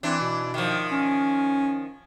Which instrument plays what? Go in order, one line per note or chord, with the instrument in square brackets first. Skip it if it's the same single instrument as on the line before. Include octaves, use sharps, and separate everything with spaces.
[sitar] E3 D4 [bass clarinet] C4
[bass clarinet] B2
[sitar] D#3 F3
[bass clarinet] C#4